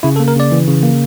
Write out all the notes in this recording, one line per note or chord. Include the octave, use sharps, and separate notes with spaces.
C#3 E4
A4
A#3
A#4
C#3 D5
E3
C#3
A#3